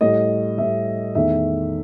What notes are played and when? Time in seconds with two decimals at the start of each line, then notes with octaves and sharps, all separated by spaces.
0.01 A2 G3 D#5
0.58 A2 G3 E5
1.15 E2 D#3 A3 E5